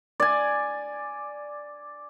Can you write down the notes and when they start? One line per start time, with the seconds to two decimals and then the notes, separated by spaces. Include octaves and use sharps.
0.20 D5 G#5